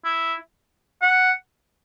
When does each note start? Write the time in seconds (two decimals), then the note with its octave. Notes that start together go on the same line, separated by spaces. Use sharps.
0.05 E4
1.02 F#5